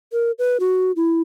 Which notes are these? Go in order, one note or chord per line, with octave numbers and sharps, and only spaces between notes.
A#4
B4
F#4
E4